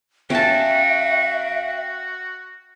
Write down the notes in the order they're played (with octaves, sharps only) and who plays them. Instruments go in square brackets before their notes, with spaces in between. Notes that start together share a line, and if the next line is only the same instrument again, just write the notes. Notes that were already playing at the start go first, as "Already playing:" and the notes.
[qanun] C#4 A5 [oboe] F#4 [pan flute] E5 [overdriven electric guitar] F5 G5